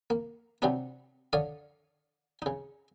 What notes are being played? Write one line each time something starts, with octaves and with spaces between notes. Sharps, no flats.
A#3
C3 E3 F#3 C4 D4 D#4
D3 C#5 D5 F5 D#6
C#3 D#4